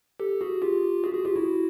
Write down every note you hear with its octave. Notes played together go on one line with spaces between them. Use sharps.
G4 A4
F#4 G#4
F4 G4
F#4 G#4
F#4 G#4
F4 G4
E4 F#4